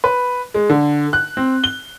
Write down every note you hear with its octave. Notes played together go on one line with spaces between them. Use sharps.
B4
G#3
D3
F#6
C4
G7